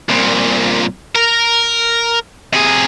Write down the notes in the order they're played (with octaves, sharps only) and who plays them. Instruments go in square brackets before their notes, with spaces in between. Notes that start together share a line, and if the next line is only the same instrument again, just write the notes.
[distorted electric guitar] C2 A#2
A#4
C3 G#4